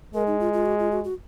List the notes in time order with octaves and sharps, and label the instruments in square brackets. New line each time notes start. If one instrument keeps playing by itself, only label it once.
[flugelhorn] G#3 [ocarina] A#4
[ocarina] D#4
F4
F4
F#4
F4
F#4
F#4